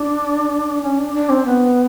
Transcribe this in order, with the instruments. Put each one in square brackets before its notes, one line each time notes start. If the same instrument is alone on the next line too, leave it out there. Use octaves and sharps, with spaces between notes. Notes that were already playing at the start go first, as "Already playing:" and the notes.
Already playing: [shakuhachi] D4
C#4
D4
D4
C4
B3